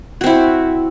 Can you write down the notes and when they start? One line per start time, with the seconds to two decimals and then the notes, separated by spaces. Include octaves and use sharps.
0.21 F#4
0.24 C4
0.26 E4